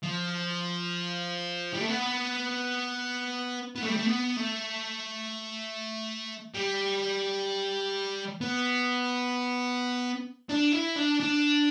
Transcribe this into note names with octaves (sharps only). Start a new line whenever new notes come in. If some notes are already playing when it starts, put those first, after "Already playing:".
F3
G3
A3
B3
B3
A3
G3
A3
B3
A3
G3
B3
D4
E4
D4
D4